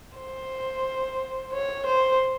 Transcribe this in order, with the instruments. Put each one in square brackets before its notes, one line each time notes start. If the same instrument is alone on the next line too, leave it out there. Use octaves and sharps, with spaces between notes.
[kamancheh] C5
C#5
C5